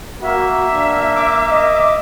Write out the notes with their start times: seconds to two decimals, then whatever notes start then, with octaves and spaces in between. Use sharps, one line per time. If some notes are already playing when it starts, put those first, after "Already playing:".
0.22 A#3 F#4 E5
0.73 D4
1.16 D6
1.51 D#5